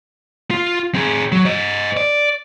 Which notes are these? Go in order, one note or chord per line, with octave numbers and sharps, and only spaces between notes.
F4
C4 G#4
F#3
C5 D#5
D5